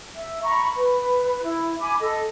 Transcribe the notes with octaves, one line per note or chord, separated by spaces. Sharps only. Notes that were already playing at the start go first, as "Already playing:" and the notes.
E5
A#5 B5 C#6
B4
E4
G#5 B5 D6
A4 D#5